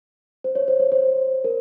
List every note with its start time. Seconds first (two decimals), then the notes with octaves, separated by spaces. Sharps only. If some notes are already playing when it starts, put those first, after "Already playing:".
0.44 C5
0.55 C#5
0.68 C5
0.80 C#5
0.92 C5
1.44 A#4